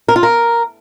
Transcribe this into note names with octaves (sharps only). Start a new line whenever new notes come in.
A#4
F4
A#4